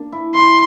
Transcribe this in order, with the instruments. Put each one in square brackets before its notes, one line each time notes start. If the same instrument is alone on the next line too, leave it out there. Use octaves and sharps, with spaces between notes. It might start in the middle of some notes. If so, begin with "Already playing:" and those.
Already playing: [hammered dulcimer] A#3 D4
E4
[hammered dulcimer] E4 [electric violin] C6